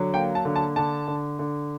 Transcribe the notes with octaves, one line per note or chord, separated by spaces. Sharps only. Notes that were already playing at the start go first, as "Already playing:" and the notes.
Already playing: D3 F#3
A#3 G5
A5
D3
A5
D3 A5
D3
D3